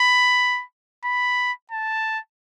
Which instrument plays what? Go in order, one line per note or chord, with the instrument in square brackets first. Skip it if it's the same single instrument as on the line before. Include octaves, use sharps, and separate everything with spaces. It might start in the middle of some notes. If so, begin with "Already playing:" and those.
Already playing: [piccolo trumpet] B5
B5
A5